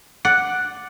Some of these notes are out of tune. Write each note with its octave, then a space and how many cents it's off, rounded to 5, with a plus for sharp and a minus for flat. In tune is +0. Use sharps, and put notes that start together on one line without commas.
D5 +0 F#5 +0